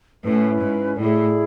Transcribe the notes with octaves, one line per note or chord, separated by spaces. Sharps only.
A2 C#4 E4 B4
G#2
A2 E4 G#4 D5